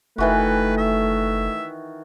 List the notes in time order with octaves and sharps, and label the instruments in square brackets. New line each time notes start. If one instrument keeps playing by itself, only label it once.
[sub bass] F#1 [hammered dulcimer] D#3 E3 F#4 [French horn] A3 [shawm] B4
[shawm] E5